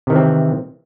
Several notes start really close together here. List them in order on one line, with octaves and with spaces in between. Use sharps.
C3 D#3 E3 C4